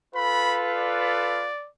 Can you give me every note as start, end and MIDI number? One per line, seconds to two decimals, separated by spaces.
0.15 1.49 65
0.15 1.49 69
0.15 1.49 71
0.15 0.59 83
0.77 1.68 74